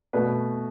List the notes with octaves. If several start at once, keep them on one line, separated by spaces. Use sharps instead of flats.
B2 A3 B4